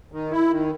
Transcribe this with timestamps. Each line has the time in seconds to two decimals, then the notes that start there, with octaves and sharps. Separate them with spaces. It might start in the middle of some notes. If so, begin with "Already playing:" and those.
0.12 D#3
0.31 E4
0.51 D#3